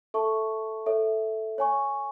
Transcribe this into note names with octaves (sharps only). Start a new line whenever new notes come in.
A4 E5 A5 C#6
A4 C#5 E5
C#5 G#5 C#6